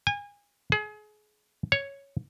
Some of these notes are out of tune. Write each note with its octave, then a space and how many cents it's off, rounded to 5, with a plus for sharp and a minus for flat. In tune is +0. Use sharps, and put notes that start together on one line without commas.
G#5 -30
G#4 +30
C#5 +0